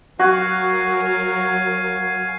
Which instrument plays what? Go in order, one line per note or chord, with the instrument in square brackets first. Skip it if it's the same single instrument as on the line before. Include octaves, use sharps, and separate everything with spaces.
[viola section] F#3 A#4 [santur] F#4 [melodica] F5 G#5